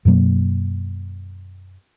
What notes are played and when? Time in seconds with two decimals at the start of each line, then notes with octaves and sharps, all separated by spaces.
0.05 F#2 B2 F#3 A#3